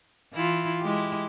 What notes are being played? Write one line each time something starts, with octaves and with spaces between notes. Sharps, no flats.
E3 E4 F4
G#3 E4 G4